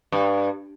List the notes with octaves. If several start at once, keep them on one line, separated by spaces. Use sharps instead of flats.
G2